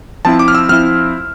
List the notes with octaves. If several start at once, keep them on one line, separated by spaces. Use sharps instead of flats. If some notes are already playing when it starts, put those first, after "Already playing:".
F3 C4 E4 A5
D6
F6
E6
F3 C4 E4 F6